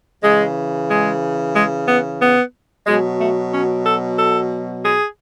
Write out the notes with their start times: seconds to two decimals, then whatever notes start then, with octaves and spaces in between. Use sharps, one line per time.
0.23 C#3 E3 G#3
0.89 G#3
1.55 G#3
1.87 B3
2.20 B3
2.86 B2 F#3 G#3
3.19 A3
3.52 C#4
3.85 A4
4.18 A4
4.84 G#4